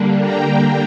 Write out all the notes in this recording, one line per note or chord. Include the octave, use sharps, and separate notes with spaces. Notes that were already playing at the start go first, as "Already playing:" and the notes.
Already playing: D3 G3 A#3 D4
G5 A#5